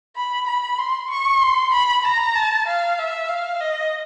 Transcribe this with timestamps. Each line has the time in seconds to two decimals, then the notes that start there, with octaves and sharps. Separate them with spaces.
0.16 B5
0.47 B5
0.78 C6
1.10 C#6
1.42 C6
1.72 B5
2.05 A#5
2.35 A5
2.67 F5
2.99 E5
3.29 F5
3.60 D#5